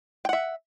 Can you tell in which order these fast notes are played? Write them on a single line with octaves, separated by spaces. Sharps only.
G5 F#5 E5